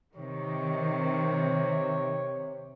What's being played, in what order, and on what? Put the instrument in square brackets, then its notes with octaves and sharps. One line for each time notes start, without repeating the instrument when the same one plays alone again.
[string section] C3 [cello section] D#3 [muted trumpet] C#5